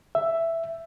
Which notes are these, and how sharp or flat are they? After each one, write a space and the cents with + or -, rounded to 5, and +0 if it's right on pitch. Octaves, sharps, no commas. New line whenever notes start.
E5 +5